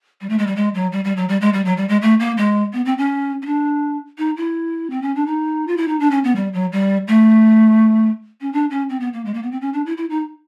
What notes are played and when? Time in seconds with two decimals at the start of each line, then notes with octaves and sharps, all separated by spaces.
0.21 G3
0.29 A3
0.39 G#3
0.47 G3
0.56 G#3
0.75 F#3
0.92 G3
1.05 G3
1.17 F#3
1.29 G3
1.41 G#3
1.54 G3
1.65 F#3
1.77 G3
1.89 G#3
2.02 A3
2.20 A#3
2.37 G#3
2.73 B3
2.85 C4
2.98 C#4
3.42 C#4
3.46 D4
4.18 D#4
4.37 E4
4.90 C4
5.02 C#4
5.15 D4
5.26 D#4
5.67 F4
5.77 E4
5.88 D#4
6.00 D4
6.11 C#4
6.24 B3
6.36 G3
6.53 F#3
6.72 G3
7.08 A3
8.41 C#4
8.53 D4
8.71 C#4
8.89 C4
9.00 B3
9.13 A#3
9.25 G#3
9.34 A#3
9.43 B3
9.52 C4
9.61 C#4
9.73 D4
9.86 E4
9.97 E4
10.10 D#4